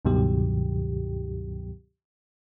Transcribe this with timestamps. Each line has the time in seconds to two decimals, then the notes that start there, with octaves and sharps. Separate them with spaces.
0.05 C#2 G2 B2 D#3 F#3 G4